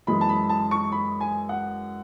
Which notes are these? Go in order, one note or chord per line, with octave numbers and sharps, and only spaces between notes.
F#2 E3 G#3 B5
A5
B5
A5
C#6
B5
G#5
F#5